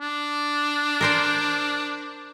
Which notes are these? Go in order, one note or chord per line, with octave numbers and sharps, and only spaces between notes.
D4
A#4 C5 D5